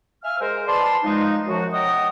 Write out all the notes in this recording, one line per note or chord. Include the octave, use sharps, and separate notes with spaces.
E5 F5 G#5 F6
G#3 A#4 C5
B4 D5 A5 C6
F3 G#3 D#4
F#2 F3 F#4
D#5 E5 F#5 G5 A#5 D#6